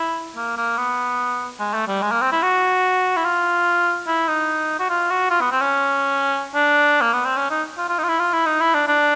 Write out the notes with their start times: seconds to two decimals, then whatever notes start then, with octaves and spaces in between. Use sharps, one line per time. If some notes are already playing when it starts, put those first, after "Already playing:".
Already playing: E4
0.36 A#3
0.57 A#3
0.77 B3
1.60 G#3
1.74 A3
1.87 G3
2.02 G#3
2.12 A#3
2.22 C4
2.32 E4
2.43 F#4
3.17 E4
3.24 F4
4.07 E4
4.28 D#4
4.79 F#4
4.89 F4
5.10 F#4
5.30 F4
5.41 B3
5.51 C4
5.61 C#4
6.55 D4
7.01 A#3
7.13 B3
7.25 C4
7.37 C#4
7.50 D#4
7.78 F4
7.89 F4
7.99 D#4
8.04 F4
8.09 E4
8.19 F4
8.33 E4
8.47 D#4
8.61 E4
8.74 D4
8.88 D4